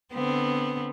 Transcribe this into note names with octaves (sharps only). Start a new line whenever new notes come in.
D3 B3 C4